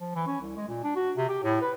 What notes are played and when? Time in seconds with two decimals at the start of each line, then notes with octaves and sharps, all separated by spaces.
0.01 F3
0.15 E3
0.27 C#4
0.41 C2
0.57 G#3
0.68 A#2
0.84 D4
0.96 F#4
1.16 C3
1.29 G4
1.43 A2
1.61 B4